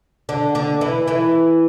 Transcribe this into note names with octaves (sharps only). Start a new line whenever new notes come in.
D3 D4
D3 D4
E3 E4
E3 E4